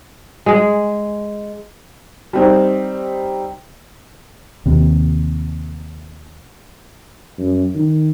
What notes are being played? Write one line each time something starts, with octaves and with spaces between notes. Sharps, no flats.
G#3 G#4
G3 C4 D#4
D#2 C3
F#2
D#3